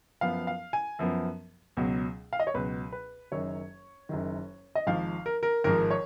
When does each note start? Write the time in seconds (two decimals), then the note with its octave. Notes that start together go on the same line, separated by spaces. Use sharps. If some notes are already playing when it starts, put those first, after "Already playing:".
0.21 F#2 F3 B3 F5
0.47 F5
0.73 G#5
0.99 F#2 F3 B3
1.77 C#2 B2 F#3
2.33 F5
2.40 D#5
2.47 C#5
2.54 C#2 B2 F#3 B4
2.92 B4
3.32 F#1 F#2 D#3 C#5
4.09 F#1 F#2 D#3
4.75 D#5
4.87 G#1 G#2 F3 F5
5.26 A#4
5.43 A#4
5.64 G#1 G#2 F3 A#4
5.91 C#5